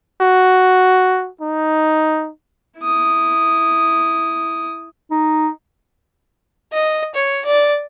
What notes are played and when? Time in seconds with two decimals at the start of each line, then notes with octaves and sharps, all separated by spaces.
0.21 F#4
1.41 D#4
2.80 E4 D#6
5.11 D#4
6.73 D#5
7.15 C#5
7.45 D5